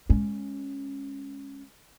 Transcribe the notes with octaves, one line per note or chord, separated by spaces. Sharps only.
G#3 C#4